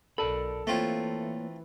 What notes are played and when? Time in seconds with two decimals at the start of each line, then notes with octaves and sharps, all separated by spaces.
0.18 B1 A4 A#4 D5 B5
0.67 E3 A3 A#3 C4 F4 C#5